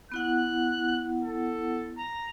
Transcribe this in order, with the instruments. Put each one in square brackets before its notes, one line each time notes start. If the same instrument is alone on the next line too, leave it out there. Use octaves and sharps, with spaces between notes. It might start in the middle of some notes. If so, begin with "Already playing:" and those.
[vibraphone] B3 E4 F#5 [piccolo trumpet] F#6
[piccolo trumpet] A4
A#5